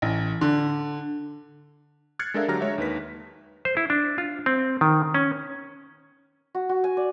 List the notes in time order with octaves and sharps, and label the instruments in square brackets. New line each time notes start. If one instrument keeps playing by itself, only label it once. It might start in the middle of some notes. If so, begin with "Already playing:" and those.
[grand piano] A1
D3
[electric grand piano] F6 F#6 G#6 A6 C7 C#7
G#3 D4 A4 A#4 E5 F5
D3 F#3 G4 A#5 F6 A#6
G#3 C#5 E5
D#2 D#3 B4 B6
[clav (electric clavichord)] C5
E4
D4
F4
C4
D#3
C#4
[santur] F#4
F#4
G#5
D5